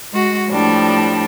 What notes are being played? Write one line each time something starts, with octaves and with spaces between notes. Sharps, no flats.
G#3 F#4
A2 F3 G3 D4